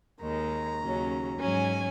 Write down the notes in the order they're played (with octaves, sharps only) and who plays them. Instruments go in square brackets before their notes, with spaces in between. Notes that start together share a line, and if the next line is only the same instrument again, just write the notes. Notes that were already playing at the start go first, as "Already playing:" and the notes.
[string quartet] D#2 D#3 G#3 A#5
D#2 C#3 F#3 C#4
G#2 F#3 C#4 G#5